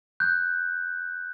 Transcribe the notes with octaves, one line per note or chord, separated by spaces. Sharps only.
F#6 G6